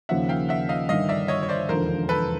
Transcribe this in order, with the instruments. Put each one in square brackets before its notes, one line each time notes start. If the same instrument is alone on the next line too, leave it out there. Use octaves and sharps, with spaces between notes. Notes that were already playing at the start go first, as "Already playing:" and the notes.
[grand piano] D#2 C#3 F3 A#3 [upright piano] E5 F#5
[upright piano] F5 G5
E5 F#5
D#5 F5
[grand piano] G1 G2 D#3 [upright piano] D#5 F5
[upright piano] D5 E5
C#5 D#5
C#5
C5 D5
[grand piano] E1 D#2 D3 F3 [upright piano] A#4 C5
[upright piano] A4 B4